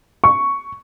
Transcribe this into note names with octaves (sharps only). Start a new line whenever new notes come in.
C#6